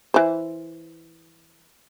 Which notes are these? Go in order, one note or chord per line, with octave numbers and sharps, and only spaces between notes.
E3 C5